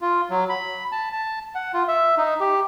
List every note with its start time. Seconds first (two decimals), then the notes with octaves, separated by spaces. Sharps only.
0.01 F4
0.30 F#3
0.49 B5
0.92 A5
1.12 A5
1.55 F#5
1.74 F4
1.88 E5
2.18 D#4
2.40 G4